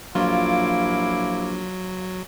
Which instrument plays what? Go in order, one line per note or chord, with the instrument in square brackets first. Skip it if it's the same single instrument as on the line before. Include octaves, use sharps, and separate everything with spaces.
[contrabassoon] A#1 [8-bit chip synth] F#3 [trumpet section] E4 F5 D6 [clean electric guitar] F4